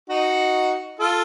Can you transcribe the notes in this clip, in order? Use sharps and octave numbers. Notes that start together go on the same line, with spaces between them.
D#4 F#4
F4 A4